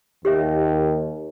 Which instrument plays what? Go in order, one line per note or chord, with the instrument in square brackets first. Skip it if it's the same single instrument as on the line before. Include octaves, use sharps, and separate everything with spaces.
[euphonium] D#2 [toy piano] G4 C#5 E5